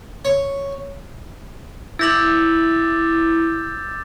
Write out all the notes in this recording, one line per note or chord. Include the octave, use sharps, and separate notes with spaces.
C#5
E4 D6 E6 G6 A6 A#6 F#7